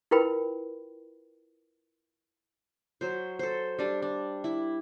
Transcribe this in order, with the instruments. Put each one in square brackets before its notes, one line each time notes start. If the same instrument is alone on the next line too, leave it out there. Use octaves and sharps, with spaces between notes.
[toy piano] E4 F4 A#4 B4 G5 B5
[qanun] F#3 C5
A4 C5
G3 D4
D4
E4